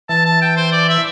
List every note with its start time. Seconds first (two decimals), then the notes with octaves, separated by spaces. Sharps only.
0.09 E3 A5
0.25 A5
0.42 G5
0.57 C5
0.72 D5
0.89 E5